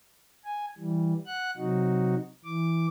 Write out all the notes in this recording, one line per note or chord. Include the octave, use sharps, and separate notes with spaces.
G#5
E3 G3
F#5 F#6
C3 F#3 D#4 F#4
E3 D6